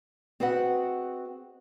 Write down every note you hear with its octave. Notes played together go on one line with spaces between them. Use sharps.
C4 F#4 G#4 B4 D#5 F#5